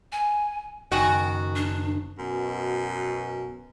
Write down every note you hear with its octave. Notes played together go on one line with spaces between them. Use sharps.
G#5
F#1 D#3 F#4 G5 G#5
D4
F#2 B2